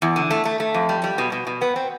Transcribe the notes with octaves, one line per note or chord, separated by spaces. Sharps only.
E2
D3
A3
A3
A3
F2
G3
G3
B2
B2
B2
B3
C4